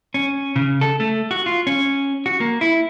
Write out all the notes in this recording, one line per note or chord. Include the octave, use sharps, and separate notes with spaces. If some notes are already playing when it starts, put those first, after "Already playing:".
C#4
C#3
A4
A3
F#4
F4
C#4
F#4
A#3
E4